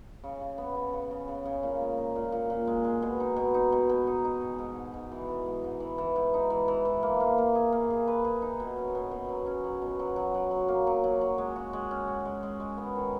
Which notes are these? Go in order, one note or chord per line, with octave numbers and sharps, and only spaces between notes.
C#3
C#3
B3
C#3
C#3
C#3
C#3
C#3
A#2
G#3
D#4
A#2
A#2
A#2
G#3
G#3
B2
D#4
B2
D#4
B2
B2
D#4
D#4
G#3
G#2
G#2
G#2
E3
E3
G#2
G#2
E3
E3
G#2
D#4
E3
E3
E3
A#3
A#3
A#3
G#4
A#3
G#4
B4
G#4
D#4
B2
C#4
B2
B2
F#3
C#4
F#3
B2
F#3
F#3
F#3
F#3
A#3
F#3
F#3
F#3
G#3
F#4
G#3
C#4
F#4
G#3
G#3
G#3
B3
D#3